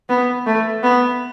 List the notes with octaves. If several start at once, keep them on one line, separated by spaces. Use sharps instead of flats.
B3
A3
B3